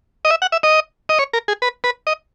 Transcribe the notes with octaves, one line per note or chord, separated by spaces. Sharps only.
D#5
E5
F#5
E5
D#5
D#5
C#5
A#4
G#4
B4
B4
D#5